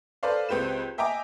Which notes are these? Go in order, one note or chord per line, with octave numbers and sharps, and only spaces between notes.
A4 B4 C5 D5 F5
C#2 C4 G4 B4 E7
D#5 E5 G5 G#5 A#5 D6